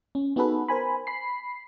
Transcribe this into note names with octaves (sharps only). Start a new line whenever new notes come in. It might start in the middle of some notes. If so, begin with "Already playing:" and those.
C#4
B3 D#4 F#4 G#4 A4 B4
A#4 C5 G#5 B5
B5 C7